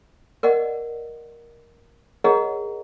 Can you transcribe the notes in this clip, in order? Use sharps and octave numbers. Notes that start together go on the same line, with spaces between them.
A#4 D5 D#5 F#5
G#4 A#4 C#5 D#5 F#5 A#5